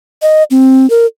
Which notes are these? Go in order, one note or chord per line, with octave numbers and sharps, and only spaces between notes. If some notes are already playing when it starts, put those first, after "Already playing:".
D#5
C4
A#4